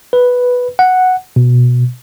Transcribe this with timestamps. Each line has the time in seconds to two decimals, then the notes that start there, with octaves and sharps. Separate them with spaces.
0.13 B4
0.79 F#5
1.36 B2